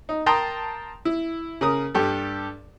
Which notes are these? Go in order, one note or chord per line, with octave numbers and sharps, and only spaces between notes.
D#4
A#4 G5 A5 A#5 C6 D#6
E4
C#3 A#4 D#6
G2 G4 A4